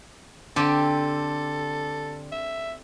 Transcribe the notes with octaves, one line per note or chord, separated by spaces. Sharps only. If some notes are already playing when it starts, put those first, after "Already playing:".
D3 C4 G4 A4
E5